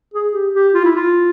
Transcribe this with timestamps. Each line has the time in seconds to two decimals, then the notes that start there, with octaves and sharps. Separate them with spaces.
0.14 G#4
0.33 G4
0.54 G4
0.74 F4
0.84 E4
0.95 F4